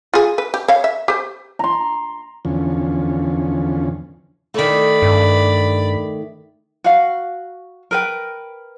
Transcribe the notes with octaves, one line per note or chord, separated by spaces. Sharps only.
F4 G#4
B4
G4
C#5 F5
E5
G4 C5
A#5 C6
E2 D3 F3 C#4
D#3 A3 D5 B5
G2
F#4 F5
A#4 B4 G5